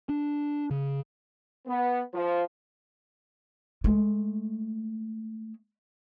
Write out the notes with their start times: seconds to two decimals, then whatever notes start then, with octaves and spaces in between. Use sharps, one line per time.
0.09 D4
0.71 C#3
1.67 B3
2.14 F3
3.84 G#3 A3